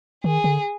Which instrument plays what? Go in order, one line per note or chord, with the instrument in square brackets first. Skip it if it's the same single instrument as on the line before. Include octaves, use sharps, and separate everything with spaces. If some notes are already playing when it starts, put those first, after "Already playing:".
[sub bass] D#3 [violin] G#4
[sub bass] D3